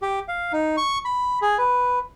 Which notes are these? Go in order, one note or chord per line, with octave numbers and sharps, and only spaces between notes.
G4
F5
D#4
C#6
B5
G#4
B4